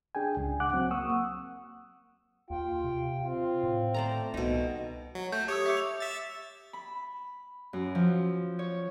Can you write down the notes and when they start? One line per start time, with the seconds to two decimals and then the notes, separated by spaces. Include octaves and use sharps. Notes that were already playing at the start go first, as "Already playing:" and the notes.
0.15 D4 G#4 G5 G#5
0.37 C#2
0.60 F#5 D6 F#6
0.73 F#3 C4
0.91 A#3 F#5 C#6 D#6 E6
2.50 D#2 F4 G5
2.84 C3
3.23 C4 F4
3.63 A2
3.94 A3 C5 D5 A#5
4.34 C2 B2 D#4
5.15 F#3
5.32 A3 G6
5.48 G4 C#5 D#6 E6
5.66 E5 D6 C#7
5.77 F7
6.00 E5 A6
6.73 B5
7.73 F#2
7.95 F3
8.59 C#5